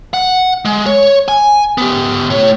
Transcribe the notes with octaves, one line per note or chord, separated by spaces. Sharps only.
F#5
G#3
C#5
G#5
B3 G4
A2 C#5